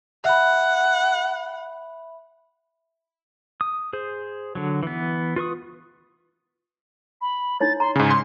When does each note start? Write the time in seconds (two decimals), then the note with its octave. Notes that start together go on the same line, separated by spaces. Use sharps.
0.25 E5 F#5 B5
3.61 D#6
3.93 G#4 C5
4.55 D3 F#3
4.83 E3 B3
5.36 F4 B4 C#6 D#6
7.21 B5
7.60 D#4 E4 C#5 A6
7.80 A#5 C6
7.96 G#2 C#3 G#5
8.11 C6